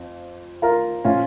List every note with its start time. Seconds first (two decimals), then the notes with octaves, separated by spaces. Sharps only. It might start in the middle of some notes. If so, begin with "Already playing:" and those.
Already playing: F2 F3
0.62 F4 A#4
1.04 A#2 F3 C#4 F4